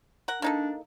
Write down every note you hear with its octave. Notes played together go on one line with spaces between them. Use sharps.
A#4 F#5
A#3 D4 D#4 A4